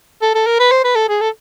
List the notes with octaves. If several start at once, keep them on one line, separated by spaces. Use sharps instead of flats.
A4
A4
A#4
B4
C5
B4
A4
G#4
A4